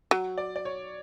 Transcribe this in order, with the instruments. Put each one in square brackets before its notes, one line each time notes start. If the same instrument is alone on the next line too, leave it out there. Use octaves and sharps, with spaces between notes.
[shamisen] F#3
[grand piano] D5
D5
C#5